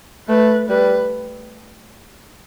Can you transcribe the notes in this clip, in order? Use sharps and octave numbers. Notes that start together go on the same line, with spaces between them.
A3 B4
G3 B4